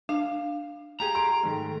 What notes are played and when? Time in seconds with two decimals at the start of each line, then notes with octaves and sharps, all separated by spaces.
0.09 D4 F5
1.00 F4 G4 G#4 G5 A#5
1.15 C6 D7
1.43 G#2 D#3 A3